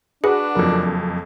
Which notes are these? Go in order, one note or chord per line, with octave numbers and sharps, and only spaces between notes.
D4 F#4 G#4 B4 F#5
F#1 F2 F3 F#3 A#4